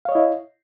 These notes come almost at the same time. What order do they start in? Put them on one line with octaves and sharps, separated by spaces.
F5 C#5 D#5 E4